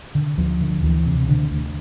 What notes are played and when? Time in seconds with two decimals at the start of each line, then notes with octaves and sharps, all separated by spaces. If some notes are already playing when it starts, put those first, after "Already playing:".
0.15 D3
0.37 D2 F3
0.61 D3
0.83 D2 E3
1.06 C3
1.28 D2 D3
1.50 D2